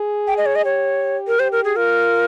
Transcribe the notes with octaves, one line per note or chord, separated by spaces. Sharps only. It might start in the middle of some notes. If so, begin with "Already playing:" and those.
Already playing: G#4
G5
D#5
C#5
D#5
G4 C#5
A#4
G4 C5
A#4
G#4
F4 A#4